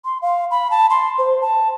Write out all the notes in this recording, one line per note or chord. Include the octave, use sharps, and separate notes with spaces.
C6
F5
B5
A5
C6
C5
A5